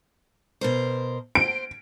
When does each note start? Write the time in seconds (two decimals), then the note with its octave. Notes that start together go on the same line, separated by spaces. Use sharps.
0.61 B2 A#4 C5
1.35 C5 D7